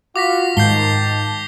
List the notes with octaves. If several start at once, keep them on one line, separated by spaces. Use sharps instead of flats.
F4 F#4 F5 D6 A#6 B6
G#2 D#3 A5 G6 C7 G7